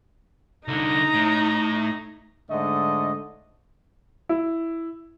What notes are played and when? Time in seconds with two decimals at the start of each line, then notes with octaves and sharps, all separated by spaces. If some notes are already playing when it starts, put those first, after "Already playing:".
0.68 C2 D3 D#4 A#5
1.14 A2
2.50 G#2 D3 A3 D#5
4.29 E4